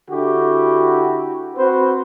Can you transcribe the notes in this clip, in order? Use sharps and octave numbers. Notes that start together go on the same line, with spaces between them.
D3 E4 F#4 G4
C4 F#4 B4 C5